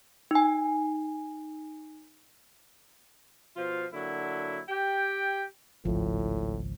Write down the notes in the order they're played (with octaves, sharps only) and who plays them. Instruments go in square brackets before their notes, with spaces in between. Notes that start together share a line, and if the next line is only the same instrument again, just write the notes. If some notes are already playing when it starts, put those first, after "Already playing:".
[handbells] D#4 G#5
[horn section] B2 F3 F4
D3 F#3 A#3 E4
G4 G5
[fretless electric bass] G#1 C#2 [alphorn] A2 [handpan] F3